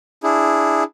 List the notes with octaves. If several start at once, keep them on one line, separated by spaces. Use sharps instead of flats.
D4 E4 G#4